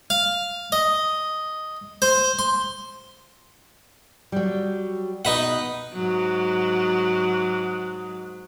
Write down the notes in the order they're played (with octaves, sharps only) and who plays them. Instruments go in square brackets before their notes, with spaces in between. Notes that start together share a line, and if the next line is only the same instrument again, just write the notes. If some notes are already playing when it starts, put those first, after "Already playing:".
[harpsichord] F5
D#5
C5
C6
[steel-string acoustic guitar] F#3 G3
[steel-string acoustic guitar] B2 [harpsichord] D#4 B4 F#5
[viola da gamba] G#2 F#3